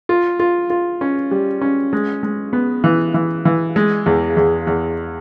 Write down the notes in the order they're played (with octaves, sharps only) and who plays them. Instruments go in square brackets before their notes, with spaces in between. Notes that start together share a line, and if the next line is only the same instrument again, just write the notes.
[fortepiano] F4
F4
F4
C#4
G3
C#4
G#3
G#3
B3
E3
E3
E3
G#3
E2
E2
E2